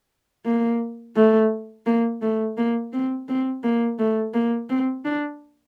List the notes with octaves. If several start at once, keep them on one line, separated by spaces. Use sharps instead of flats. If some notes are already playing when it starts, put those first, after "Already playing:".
A#3
A3
A#3
A3
A#3
C4
C4
A#3
A3
A#3
C4
D4